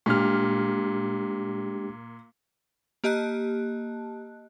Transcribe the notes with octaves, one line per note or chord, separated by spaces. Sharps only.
A#2 G#3 D4 G4 F6
A#3 G4 D#5 A5 F#6